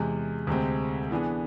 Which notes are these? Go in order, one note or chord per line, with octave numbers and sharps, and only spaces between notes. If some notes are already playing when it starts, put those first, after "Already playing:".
Already playing: E2 C3 G#3
D2 C3 G#3 C4
E3 B3 D4 G#4